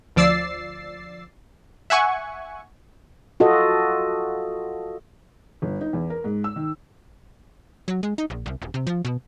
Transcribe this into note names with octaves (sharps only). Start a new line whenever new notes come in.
D2 F3 D5 E6 A6 C7
E5 F#5 G#5 C#6
F4 F#4 A4 D#5
G1
D#4
E2
A#4
G#2
E6
D#3
F#3
G#3
D#4
A#1
C2
D#1
C3
F3
B2